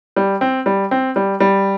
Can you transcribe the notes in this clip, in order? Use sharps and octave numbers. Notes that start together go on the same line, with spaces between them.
G3
C4
G3
C4
G3
G3